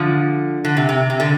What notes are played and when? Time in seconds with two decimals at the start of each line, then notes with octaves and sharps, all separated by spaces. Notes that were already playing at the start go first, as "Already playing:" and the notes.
Already playing: D3 F3
0.65 D3
0.77 C3
0.89 C3
1.10 C3
1.20 D3